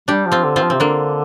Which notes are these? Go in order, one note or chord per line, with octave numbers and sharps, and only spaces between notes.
G3 D4 G4
F3
C4 F4
D3
C4 F4
F3
C3 C4
D3 A#3 D4